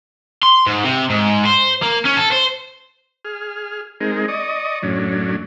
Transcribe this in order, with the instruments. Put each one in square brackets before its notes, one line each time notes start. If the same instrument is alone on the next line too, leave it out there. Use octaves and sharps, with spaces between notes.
[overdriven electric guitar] C6
G#2
C3
G#2
C5
A#3
C#4
A4
C5
[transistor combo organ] G#4 F6
G#3 C4 D#4 G#4 A#4
D5 D#5 C#6 D#6
F#2 A2 F#3 C#4 D4